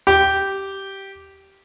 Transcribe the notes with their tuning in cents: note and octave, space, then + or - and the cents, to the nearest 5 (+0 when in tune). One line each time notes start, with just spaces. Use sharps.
G4 -10